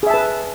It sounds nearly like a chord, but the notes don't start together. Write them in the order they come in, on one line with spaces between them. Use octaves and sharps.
G#4 E5 A5 B4